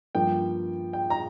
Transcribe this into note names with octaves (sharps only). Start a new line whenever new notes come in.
G2 F3 A#3 G5
G5
A#5